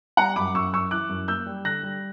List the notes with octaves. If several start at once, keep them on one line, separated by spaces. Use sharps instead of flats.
G3 F#5 A#5
F#2 B5 D6
F#2 C#6 E6
F#2 C#6 E6
E3 D6 F#6
F#2
A#3 E6 G6
G3
D3 F#6 A#6
G3